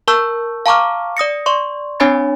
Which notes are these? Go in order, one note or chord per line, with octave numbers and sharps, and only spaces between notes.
A#4 A5 C#6 E6 G6
F5 A5 A#5 C#6 D6 F6
D5 D#6 A#6 C#7
D5 C6 C#6
C4 D4 C#5 G#5 B5 A6